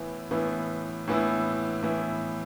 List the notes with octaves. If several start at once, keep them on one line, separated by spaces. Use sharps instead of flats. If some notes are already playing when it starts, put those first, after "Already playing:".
Already playing: A2 E3 B3 E4
A2 E3 B3 E4
A2 E3 B3 E4
A2 E3 B3 E4